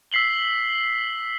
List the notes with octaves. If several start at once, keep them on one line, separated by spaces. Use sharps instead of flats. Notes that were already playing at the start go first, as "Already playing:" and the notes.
E6 B6 C7 F#7 G7